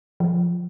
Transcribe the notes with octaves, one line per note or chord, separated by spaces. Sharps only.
F3